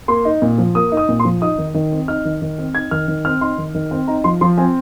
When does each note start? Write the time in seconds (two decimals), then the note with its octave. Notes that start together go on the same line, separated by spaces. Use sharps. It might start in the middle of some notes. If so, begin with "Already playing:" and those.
0.08 A#3 C6
0.25 D#4
0.42 A#2
0.58 F3
0.75 A#3 D#6
0.92 D#4
0.97 D#6
1.09 A#2
1.20 C6
1.25 F3
1.42 D#4 D#6
1.58 D#3
1.74 D#3
1.92 C4
2.08 D#4 F6
2.25 D#3
2.42 D#3
2.58 C4
2.74 D#4 G#6
2.91 D#3 F6
3.08 D#3
3.25 C4 F6
3.41 D#4 C6
3.58 D#3
3.75 D#3
3.91 C4
4.08 D#4 A#5
4.24 F3 C6
4.41 F3 C6
4.58 C4 G#5